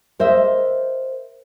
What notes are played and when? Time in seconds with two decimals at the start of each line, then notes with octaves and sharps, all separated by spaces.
0.19 A#4 C5 D#5 E5